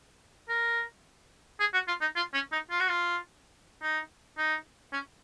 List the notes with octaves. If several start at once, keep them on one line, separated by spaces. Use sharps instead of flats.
A#4
G#4
F#4
F4
D#4
F4
C#4
D#4
F4
F#4
F4
D#4
D#4
C#4